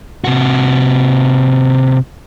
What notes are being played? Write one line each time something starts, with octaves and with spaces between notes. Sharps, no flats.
C3 F#4